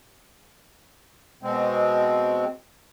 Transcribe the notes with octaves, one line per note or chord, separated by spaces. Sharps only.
B2 G#3 C4